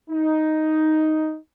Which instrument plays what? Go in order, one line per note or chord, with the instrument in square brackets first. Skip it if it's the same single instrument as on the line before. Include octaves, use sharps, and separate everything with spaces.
[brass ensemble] D#4